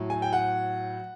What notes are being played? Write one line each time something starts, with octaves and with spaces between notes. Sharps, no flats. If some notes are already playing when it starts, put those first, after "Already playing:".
Already playing: A2 F#3
G#5
G5
F#5